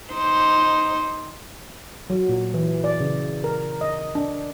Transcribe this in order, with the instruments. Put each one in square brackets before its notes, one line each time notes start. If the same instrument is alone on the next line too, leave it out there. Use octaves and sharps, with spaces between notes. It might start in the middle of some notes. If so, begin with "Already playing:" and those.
[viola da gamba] D#4 C5
[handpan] F#3
A#2
E3
D5
C#3
A#4
D#5
D4